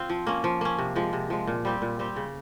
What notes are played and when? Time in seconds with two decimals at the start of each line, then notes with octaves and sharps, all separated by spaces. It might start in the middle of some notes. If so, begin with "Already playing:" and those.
Already playing: C4 F4
0.09 F3
0.27 A#3 C#4
0.44 F3
0.61 A#3 C#4
0.79 C3
0.96 F3 G#3
1.13 C3
1.30 F3 G#3
1.47 A#2
1.65 G3 C4 G4
1.82 A#2
1.99 G3 C4 G4
2.16 C#3